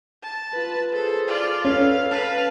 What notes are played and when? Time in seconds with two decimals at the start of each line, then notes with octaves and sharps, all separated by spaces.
0.22 A5
0.53 F4 B4
0.93 G#4 A4 C5
1.27 F4 D5
1.65 C#4 A4 B4 F5
2.11 B4 F5 A5